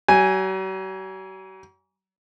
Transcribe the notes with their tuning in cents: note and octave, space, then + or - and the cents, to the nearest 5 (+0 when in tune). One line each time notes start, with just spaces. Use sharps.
F#3 +45 G#5 +0